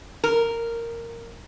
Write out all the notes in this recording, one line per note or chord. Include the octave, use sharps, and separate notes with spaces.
A#4